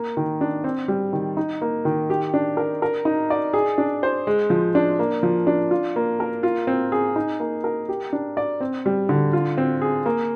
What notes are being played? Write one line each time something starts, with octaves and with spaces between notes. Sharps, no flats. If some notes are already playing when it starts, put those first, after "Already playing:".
Already playing: A#3
D#3
D4
C4
G3
D#3
D#4
A#3
D#3
G4
D4
A#4
A#4
D#4
D5
G#4
D4
C5
G#3
F3
D4
A#3
F3
D4
F4
A#3
A#4
F4
C4
G#4
D#4
A#3
A#4
G4
D4
D5
C4
G3
D3
F4
C4
G#4
A#3